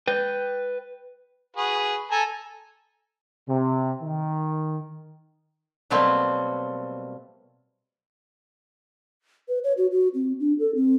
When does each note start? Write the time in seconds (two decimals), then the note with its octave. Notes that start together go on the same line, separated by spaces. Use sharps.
0.07 B4 G5
1.56 F#4 G#4 B4
2.11 A4 G#5 A#5
3.48 C3
4.02 D#3
5.90 B2 F#3 G3 A3 A#3 C4
9.48 B4
9.64 C#5
9.78 F#4
9.92 F#4
10.14 C4
10.40 D4
10.59 A4
10.75 C4